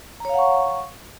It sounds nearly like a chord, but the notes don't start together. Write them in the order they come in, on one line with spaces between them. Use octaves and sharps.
A#5 C#5 F5 F#5 C#6